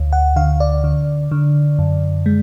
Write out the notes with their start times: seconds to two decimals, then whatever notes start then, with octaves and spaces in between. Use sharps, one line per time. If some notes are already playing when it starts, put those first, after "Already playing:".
Already playing: D2
0.13 F#5
0.36 D3 F5
0.60 D5
0.84 D3
1.32 D3
1.79 F#2
2.26 G#3